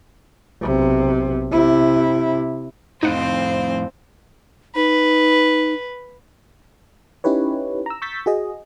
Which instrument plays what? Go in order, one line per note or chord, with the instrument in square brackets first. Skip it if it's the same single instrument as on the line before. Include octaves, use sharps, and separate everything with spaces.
[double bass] B1 C3
C3 E4
[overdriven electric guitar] F2 A2 [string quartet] C4 C5 [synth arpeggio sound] D#4 F#5 [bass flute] F5
[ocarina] D#4 [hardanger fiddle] B4
[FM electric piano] C#4 D#4 E4 G4 B4 C#5
A#5 E6
C#6 E6 G6 A6 B6
F#4 G#4 D#5